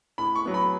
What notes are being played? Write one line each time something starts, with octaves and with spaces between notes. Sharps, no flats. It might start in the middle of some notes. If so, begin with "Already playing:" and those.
A2 B5
C#6
F#3 B3
B5